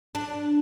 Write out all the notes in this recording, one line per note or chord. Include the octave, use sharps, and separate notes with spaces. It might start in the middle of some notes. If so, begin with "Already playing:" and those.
D4